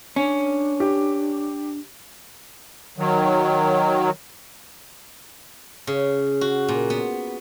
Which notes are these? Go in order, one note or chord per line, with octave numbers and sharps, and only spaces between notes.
C#4 D4
G4
D#3 F#3
C#3
F#4
A#2
B3